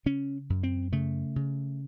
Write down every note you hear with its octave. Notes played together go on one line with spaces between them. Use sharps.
C#3 C#4
F#2
C4
C#3 A3
C#3